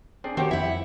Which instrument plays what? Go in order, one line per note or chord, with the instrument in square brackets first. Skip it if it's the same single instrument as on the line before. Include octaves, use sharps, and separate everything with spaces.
[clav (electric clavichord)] C4 D4 G#4
[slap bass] D#3 [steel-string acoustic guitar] C4 [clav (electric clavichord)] F#4 G4 C#5
[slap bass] F2 [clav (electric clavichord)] E4 [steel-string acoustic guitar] E5 F#5